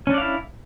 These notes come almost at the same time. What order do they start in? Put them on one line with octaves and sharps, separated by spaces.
C#4 D4 D5 F5 E4